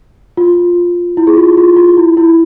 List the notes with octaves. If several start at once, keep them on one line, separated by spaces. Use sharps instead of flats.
F4
E4
G#4
F4
F4
F4
E4
E4